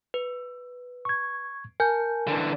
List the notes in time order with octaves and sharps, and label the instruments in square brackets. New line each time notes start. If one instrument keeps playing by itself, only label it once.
[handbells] B4
[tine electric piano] C#6 G#6
[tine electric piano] A#4 A5 [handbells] G#5 G6
[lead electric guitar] D3 E3